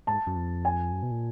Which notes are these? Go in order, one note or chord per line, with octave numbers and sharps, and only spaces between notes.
G#2 A5
F#2
F2
G#5
F#2
B2
A#2